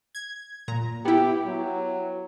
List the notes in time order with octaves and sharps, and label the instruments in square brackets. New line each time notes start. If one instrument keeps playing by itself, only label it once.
[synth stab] G#6
A#2 A#5
[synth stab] B3 E4 [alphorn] G4
[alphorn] F#3